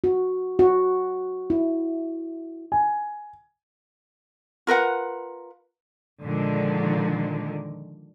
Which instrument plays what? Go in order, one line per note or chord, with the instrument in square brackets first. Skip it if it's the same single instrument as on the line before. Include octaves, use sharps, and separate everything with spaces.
[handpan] F#4
F#4
E4
[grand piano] G#5
[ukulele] F4 A#4 B4 F#5
[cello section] A#2 D3 D#3 F3 G#3